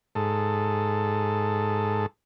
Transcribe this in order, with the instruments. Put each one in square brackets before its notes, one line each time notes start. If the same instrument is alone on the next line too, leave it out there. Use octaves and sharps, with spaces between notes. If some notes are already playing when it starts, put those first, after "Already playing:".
[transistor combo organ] G#2 A4